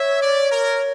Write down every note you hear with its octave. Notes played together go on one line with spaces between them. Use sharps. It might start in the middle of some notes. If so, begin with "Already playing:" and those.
Already playing: C#5 E5
D5
A#4